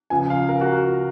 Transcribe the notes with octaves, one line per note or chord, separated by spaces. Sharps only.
C#2 C#3 F3 G#5
F5
A#4
F#4